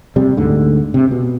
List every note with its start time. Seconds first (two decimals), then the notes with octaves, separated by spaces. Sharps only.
0.16 C3 G3
0.37 D2 G#2 D3
0.94 C3
1.11 B2